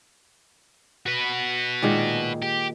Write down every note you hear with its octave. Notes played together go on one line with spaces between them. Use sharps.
F#4 B4
A#2 D#3 G#3
G4